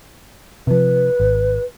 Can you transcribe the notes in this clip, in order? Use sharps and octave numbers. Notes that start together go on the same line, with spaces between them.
C3 F3 B4
G#1